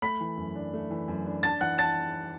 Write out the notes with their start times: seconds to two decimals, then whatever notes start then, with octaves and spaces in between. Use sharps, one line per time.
0.02 A3 B5 B6
0.20 E3
0.37 F#2
0.55 D4
0.74 A3
0.91 E3
1.08 F#2
1.26 D4
1.43 D4 A5 A6
1.61 E3 F#5 F#6
1.78 A5 A6